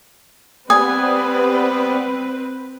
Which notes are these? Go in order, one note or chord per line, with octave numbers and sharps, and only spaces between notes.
G3 B3 C4 B4 G#5 D#6